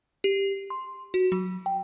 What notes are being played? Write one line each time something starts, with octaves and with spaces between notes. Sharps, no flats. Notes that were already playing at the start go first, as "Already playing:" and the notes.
G4
C6
F#4
F#3
G5